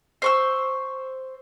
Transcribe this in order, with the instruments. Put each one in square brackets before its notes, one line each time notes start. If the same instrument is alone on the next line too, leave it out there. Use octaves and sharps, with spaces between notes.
[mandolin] C5 C#6 E6